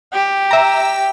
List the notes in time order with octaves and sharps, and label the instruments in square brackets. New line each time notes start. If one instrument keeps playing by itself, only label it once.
[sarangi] G4
[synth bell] E5 A#5